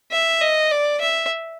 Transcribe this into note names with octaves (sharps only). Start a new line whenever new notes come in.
E5
D#5
D5
E5